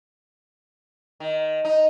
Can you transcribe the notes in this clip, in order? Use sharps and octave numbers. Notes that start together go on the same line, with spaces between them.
D#3
D#4